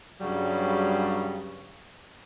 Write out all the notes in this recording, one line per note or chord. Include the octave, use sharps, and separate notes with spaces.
G2 C#3 F#3 G3